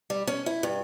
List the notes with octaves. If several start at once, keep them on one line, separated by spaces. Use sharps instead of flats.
G3
C#4
E4
G2